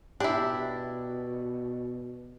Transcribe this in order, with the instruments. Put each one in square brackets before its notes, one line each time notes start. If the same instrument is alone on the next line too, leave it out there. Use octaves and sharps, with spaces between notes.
[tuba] B2 [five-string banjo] D4 E4 [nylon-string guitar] G4